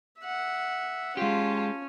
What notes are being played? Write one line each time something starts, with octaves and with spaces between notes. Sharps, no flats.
E5 F#5
G#3 C#4 F4 G4 A5